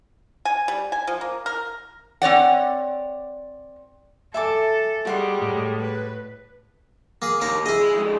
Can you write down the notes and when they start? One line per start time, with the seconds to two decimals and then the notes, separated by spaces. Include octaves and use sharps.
0.45 G#5
0.68 G3
0.92 G#5
1.07 F3
1.21 A#3
1.46 A#4
2.22 C4 C#5 D5 F#5
4.34 A4 E5 G#5 D6
5.05 G3 G#3 F#4 F#5 C6
5.39 A2
5.82 B4
7.22 A#3 G#4
7.41 D#2 A#3 A#4
7.66 E4 G#4 D#5
7.81 G#3
7.95 F2 G#3